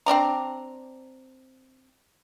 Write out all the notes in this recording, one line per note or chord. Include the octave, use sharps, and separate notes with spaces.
C4 D4 D5 A#5